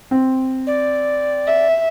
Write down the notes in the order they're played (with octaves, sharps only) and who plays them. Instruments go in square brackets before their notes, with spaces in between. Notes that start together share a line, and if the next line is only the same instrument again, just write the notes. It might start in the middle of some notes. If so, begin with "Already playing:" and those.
[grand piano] C4
[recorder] D5
[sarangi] E5